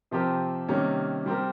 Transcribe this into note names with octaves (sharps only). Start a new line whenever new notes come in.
C3 F3 C4 G4 A#4
C3 D#3 G3 A#3 C#4
G3 C4 G4 A#4